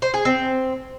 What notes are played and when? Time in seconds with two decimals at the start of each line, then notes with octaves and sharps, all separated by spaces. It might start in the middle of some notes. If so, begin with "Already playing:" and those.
0.02 C5
0.14 G#4
0.25 C4